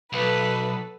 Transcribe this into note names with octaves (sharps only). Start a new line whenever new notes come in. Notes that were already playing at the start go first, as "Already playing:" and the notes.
B1 A4 B4